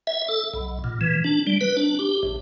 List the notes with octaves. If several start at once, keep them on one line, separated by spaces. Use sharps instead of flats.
E5
A4
B1
A#2
E3
D4
G3
B4
D4
G4
A1